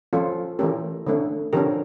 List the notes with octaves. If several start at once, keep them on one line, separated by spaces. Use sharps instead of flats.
F3 C#4 F4 A4
E3 A3 C#4 G4 A#4
D3 A3 C#4
D3 F3 C#4 G4 A#4